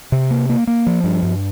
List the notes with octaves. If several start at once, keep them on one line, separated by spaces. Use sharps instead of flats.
C3
A#3
A#3
A#3
F3
G2
G2